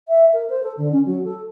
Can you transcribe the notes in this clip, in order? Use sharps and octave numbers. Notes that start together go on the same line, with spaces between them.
E5
A#4
C5
A4
D3
C#4
F#3
A4